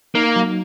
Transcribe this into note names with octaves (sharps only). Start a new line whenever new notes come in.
A#3 D#4
F#3